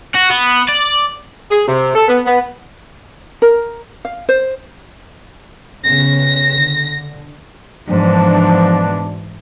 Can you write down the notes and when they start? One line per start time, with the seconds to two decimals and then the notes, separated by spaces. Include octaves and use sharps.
0.15 F#4
0.30 B3
0.69 D5
1.51 G#4
1.68 C3
1.95 A4
2.08 B3
2.26 B3
3.42 A#4
4.05 F5
4.29 C5
5.84 C#3 B3 C#4 A#6
6.52 D3
7.89 G#2 B2 E3 F3 D4